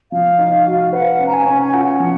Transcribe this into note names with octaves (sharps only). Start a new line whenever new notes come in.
F3 F5
D#4
F#4
B4 F#5
C#4
A#5
G#5
C#4
G#5
F4 F#5
F3